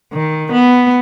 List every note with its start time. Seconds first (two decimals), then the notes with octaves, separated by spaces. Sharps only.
0.13 D#3
0.52 B3